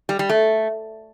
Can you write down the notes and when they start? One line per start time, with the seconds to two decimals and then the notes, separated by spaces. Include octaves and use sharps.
0.09 G3
0.19 G3
0.29 A3